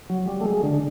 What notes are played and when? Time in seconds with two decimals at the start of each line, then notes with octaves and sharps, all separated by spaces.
0.10 F#3
0.28 G3
0.41 A3
0.45 G#3
0.63 D3